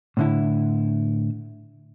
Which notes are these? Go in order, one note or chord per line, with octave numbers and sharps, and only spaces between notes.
A2 D3 E4